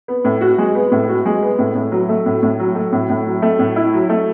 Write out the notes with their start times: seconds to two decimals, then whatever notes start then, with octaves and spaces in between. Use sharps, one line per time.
0.08 B3
0.25 A2
0.41 F#4
0.58 G#3
0.75 B3
0.92 A2
1.09 F#4
1.26 G#3
1.43 B3
1.59 A2
1.75 A2
1.92 F#3
2.09 A3
2.26 A2
2.43 A2
2.59 F#3
2.75 A3
2.93 A2
3.09 A2
3.26 F#3
3.42 A3
3.59 A2
3.76 E4
3.93 F#3
4.09 A3